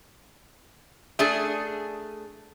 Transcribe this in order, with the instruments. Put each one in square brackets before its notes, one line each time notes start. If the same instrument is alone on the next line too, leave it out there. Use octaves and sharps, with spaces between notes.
[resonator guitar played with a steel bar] A3 D4 G#4